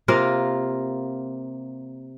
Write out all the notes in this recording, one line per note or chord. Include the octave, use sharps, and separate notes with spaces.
C3 A#3 F4 A#4